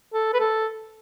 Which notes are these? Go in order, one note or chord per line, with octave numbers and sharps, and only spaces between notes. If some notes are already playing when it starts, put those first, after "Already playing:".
A4
B4
A4